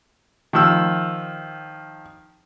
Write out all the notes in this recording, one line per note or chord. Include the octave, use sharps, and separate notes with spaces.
D#3 F3 E6